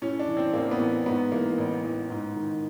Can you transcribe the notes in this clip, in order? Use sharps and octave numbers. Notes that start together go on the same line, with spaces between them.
A2 C#4
D4
E3
C4
A1 A#3
B3
A1
G#2 B3
E3 A#3
A1
A1
G#2
D#3